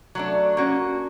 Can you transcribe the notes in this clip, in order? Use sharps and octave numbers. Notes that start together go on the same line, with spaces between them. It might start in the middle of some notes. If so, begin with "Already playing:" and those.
F#3 A3 D4
A#3 C#4 F#4